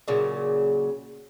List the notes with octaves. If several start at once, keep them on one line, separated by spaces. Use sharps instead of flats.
A#2 C#3 F#3